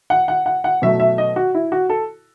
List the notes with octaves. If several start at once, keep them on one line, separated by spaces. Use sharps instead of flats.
F#5
F#5
F#5
F#5
B2 F#3 A3 E5
E5
D#5
F#4
E4
F#4
A4